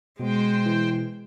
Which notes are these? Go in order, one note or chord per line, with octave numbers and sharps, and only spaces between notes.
B2 G#3 C5 G5
E3